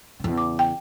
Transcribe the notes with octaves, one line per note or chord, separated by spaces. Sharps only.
E2 C#3
D6
G5